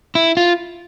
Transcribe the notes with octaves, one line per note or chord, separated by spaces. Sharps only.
E4
F4